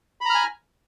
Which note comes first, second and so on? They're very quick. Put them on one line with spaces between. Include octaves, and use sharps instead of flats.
B5 A#5 F6 G#5